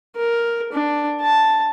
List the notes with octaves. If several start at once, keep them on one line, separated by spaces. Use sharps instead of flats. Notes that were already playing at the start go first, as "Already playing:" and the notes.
A#4
D4
A5